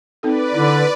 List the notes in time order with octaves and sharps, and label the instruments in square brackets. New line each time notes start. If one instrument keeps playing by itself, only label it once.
[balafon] C4 D#4 A4 [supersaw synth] B4 D5
[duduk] D3 [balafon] E4